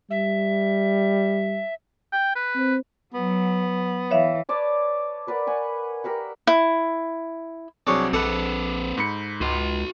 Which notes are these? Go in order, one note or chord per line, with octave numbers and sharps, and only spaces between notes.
G3 E5
G5
B4
C4 C5
F#3 B3
E3 C#5 E5 F5
B4 C#5 D5 A5
A#4 B4 D5 F#5
F#5 G#5 C#6
G4 A#4 E5 F#5
E4
C2 F#3 C4 D4 G#4 C#5
A#1 C4 A4 B4 F#5 D6
G#2 B5 C#7
C#2 F#4 C6